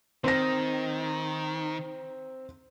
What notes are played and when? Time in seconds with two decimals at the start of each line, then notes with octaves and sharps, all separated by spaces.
0.24 D#3 C4 A#6